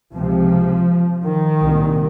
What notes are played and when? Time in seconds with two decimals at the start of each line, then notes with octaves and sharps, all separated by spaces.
0.12 C#2 C3 F3
1.24 D#3
1.62 C2 A#2